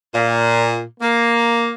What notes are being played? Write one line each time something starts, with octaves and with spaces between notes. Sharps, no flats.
A#2
A#3